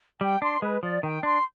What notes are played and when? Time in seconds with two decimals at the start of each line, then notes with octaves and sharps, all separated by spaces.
0.21 G3 G5
0.42 D4 C6
0.62 G#3 B4
0.83 F3 D5
1.03 D#3 G5
1.23 D4 C6